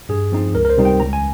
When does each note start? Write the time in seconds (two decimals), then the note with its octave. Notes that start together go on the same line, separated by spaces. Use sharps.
0.09 G2 G#4
0.32 F3 C4 D#4
0.55 C#2 A#4
0.65 A#4
0.70 C5
0.77 C3 G3 C4 D#4
0.85 G5
1.00 C#2 A#5
1.13 G#5